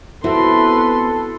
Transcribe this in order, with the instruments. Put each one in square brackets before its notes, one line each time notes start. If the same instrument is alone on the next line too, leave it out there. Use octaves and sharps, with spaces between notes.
[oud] B3 C4 E5 [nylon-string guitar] E4 F#4 [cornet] A4 [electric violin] B4 C6